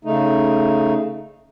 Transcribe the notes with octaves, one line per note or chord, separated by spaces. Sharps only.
C#3 A3 D#4